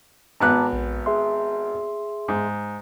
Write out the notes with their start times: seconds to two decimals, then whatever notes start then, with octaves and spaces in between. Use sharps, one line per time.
0.40 G#1 B3 A5 A#5 D6 F#6
0.73 A#1
1.06 G#4 E5 C6
2.28 G#2